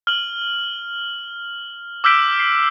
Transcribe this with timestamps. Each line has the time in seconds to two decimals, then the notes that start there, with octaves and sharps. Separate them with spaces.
0.07 F6 F#7
2.04 D6 E6 F6 G6 B6 D7
2.40 C7